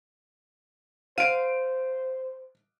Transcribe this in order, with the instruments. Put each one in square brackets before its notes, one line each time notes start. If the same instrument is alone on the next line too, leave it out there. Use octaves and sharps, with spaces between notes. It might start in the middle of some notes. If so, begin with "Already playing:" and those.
[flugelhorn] C5 [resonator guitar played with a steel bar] F5 [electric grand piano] D7 D#7